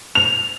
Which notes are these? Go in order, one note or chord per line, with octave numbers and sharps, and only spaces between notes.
F7